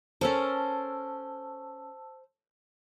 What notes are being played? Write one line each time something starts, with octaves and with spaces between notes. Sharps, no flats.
C#4 A4 A#4 C5 A5 E6